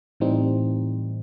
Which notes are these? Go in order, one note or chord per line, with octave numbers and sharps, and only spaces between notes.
A2 E3 G3 C4 D#4